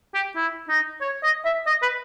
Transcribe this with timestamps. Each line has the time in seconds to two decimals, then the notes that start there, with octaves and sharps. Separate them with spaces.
0.14 G4
0.36 E4
0.69 D#4
1.01 C#5
1.23 D#5
1.45 E5
1.67 D#5
1.82 B4